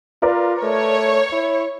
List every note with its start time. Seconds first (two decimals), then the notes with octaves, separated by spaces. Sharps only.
0.22 F4 A#4 B4 D5
0.63 A3 C#5
1.33 E4